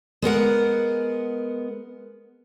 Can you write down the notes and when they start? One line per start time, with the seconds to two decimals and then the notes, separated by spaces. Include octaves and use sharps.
0.22 G#3 B3 A#4 F#5